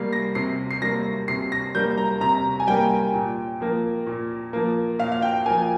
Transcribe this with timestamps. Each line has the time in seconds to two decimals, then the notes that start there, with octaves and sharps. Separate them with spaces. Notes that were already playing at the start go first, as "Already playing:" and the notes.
Already playing: C3 G3 A#3 C7
0.13 A#6
0.35 C3 C7
0.71 C7
0.82 G3 A#3 A#6
1.28 C3 C7
1.52 A#6
1.75 G3 A#3 G6
1.98 A#5
2.21 C3 A#5
2.60 G#5
2.67 G3 A#3 G5
3.14 A#2
3.60 F3 A#3
4.07 A#2
4.53 F3 A#3
4.99 A#2 F5
5.12 F5
5.22 G5
5.46 F3 A#3 G#5